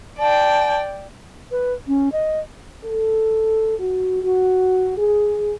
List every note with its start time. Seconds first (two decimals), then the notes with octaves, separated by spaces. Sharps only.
0.19 D5 G5 A5
1.51 B4
1.88 C#4
2.12 D#5
2.84 A4
3.78 F#4
4.22 F#4
4.97 G#4